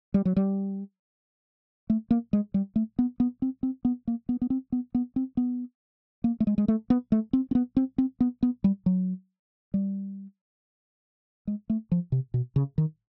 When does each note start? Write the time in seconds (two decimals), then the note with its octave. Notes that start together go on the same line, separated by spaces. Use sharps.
0.14 G3
0.25 F#3
0.37 G3
1.90 A3
2.11 A#3
2.33 G#3
2.54 G3
2.76 A3
2.99 B3
3.20 B3
3.42 C4
3.63 C4
3.85 B3
4.07 A#3
4.29 B3
4.42 B3
4.50 C4
4.72 B3
4.95 B3
5.16 C4
5.37 B3
6.24 A#3
6.40 A3
6.47 G#3
6.58 G#3
6.68 A3
6.90 B3
7.12 A3
7.33 C4
7.51 C4
7.55 B3
7.77 C4
7.98 C4
8.20 B3
8.43 B3
8.64 G3
8.86 F#3
9.74 G3
11.47 G#3
11.70 A3
11.92 F3
12.12 C3
12.34 B2
12.56 C#3
12.78 D#3